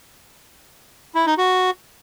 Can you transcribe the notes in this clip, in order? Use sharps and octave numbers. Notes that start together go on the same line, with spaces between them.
E4
D#4
F#4